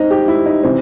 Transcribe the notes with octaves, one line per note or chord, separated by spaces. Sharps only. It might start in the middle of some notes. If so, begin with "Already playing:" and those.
Already playing: C4 D#4
G4
E4
D#4
C3 E3 C4